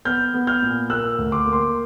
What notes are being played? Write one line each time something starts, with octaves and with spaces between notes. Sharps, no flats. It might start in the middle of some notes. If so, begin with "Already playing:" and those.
B3 F6 G6
B3
F6 G6
A#2
A#3 E6 F#6
D2
C6 D6
A#3
C6 D6